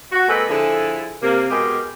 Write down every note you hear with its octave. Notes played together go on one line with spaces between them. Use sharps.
F#4
G#3 A#3 C4 A4 B4
D3 F3 E4 G#4 A4
C3 A#3
B2 G#3 G4 G#4 A#4